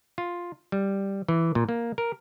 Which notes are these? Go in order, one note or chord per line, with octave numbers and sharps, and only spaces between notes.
F4
G3
E3
A#2
A#3
A#4